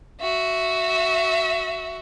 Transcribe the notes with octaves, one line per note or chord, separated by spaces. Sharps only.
F#4 E5